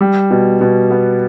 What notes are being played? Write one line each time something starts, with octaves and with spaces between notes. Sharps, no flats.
G3
B2
B2
B3